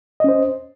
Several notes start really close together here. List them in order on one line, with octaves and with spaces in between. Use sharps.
D#5 C#4 C5